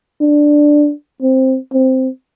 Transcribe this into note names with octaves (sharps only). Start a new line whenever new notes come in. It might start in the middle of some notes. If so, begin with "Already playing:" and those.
D4
C4
C4